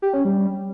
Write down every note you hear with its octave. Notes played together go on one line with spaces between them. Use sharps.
G4
C#4
G3